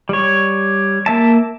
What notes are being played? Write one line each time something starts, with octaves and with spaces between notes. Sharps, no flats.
G3 C#5
A#3 E5 A5